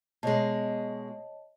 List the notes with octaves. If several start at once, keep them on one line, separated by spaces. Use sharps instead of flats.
B2 G#3 C#5 D#5 A5